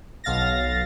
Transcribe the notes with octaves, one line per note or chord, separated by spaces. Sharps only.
B1 F5 A6 A#6